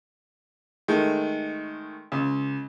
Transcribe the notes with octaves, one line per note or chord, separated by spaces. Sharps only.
D#3 G#3 A3
C#2